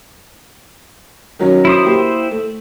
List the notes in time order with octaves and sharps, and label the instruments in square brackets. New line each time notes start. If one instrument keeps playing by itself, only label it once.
[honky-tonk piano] D#3 F#3 C#4
[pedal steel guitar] E4 C5 D#6
[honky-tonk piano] A#3 G4
A3